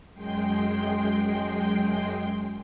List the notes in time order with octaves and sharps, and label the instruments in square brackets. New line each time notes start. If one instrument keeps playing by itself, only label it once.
[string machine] F#2 G#3 G5 C6